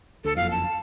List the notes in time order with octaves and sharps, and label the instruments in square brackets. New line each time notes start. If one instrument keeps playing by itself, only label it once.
[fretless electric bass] D2 [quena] A4
[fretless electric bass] F#1 F2 [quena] F5
[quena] A5